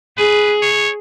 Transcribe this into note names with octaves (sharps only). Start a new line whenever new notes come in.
G#4 B4
C#5